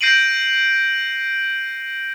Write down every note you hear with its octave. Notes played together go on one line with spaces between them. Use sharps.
G6 A#6 C7 D7 D#7 F#7